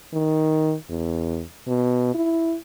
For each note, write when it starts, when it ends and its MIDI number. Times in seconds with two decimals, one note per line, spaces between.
0.13 0.74 51
0.89 1.43 40
1.67 2.10 47
2.14 2.56 64